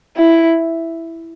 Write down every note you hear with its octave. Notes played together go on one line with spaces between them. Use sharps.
E4